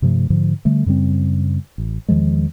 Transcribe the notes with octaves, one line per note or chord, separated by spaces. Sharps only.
G2 C3 F3 A3
G#2 D3 F3
D3 G3 A3
F#2 C#3 G3 C4
A1
E2 D#3 F3 G#3